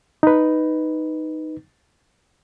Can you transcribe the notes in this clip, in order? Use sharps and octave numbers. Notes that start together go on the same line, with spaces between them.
D#4 B4